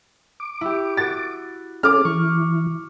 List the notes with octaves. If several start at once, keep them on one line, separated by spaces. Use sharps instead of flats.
D6
E4 G4
F#4 A6
C#4 G#4 A4 D6 F6
E3 C#6